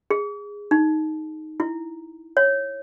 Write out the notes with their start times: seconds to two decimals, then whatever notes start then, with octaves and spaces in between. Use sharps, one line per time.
0.10 G#4
0.71 D#4
1.60 E4
2.37 C#5